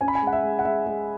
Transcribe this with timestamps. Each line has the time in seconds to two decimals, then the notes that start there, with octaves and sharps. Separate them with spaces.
0.01 C#4 G#5
0.08 B5
0.15 G#5
0.22 G#3
0.27 F#5
0.33 E5
0.44 G#3
0.59 F#5
0.65 G#3 E5
0.86 G#3